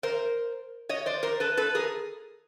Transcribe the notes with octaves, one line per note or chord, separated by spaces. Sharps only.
A#4 C5
C#5 D#5
C5 D5
A#4 C5
A4 B4
A4 B4
G#4 A#4